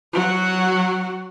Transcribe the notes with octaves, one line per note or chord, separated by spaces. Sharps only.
F#3 F#4